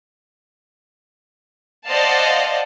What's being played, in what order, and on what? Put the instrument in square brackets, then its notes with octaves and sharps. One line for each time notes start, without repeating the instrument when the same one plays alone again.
[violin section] C5 D5 D#5 F5 F#5 A5